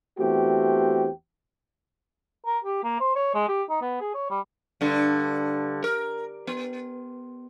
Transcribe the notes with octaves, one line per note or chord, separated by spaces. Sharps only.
E2 A3 C4 F#4 G4
A#4
G4
A#3
C5
C#5
G#3
G4
D#4
B3
G#4
C#5
G3
G2 D3
A#4
B3